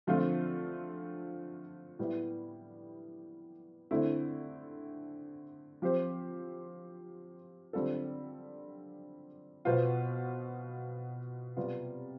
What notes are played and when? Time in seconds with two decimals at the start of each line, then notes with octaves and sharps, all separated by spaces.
0.07 D3 F3 A3 C4 F4
1.99 A2 G3 B3 E4
3.91 D3 A3 C4 E4
5.82 F3 C4 G4 C5
7.73 D3 G3 C4 F4 A4
9.65 B2 B3 F4 C5
11.57 C3 G3 B3 F4